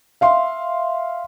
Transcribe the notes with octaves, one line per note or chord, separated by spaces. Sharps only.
E5 F5 C6